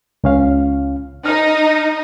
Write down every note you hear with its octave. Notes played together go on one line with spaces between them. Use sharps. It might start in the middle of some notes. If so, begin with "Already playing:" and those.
C#2 C#4 F5
D#4 F6